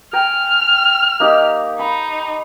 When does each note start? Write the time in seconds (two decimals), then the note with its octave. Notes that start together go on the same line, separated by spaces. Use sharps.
0.13 G5 G#5 A#5 F6
1.20 A#3 D#4 G4
1.79 D#4 B5